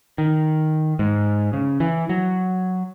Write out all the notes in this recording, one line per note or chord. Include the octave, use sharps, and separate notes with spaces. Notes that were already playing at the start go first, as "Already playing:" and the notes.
D#3
G#2
C#3
E3
F#3